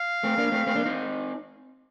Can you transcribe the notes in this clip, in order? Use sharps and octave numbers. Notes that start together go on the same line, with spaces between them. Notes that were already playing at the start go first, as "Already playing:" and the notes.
Already playing: F5
A3 C4
A#3 D4
A3 C4
A3 C4
A#3 D4
C4 D#4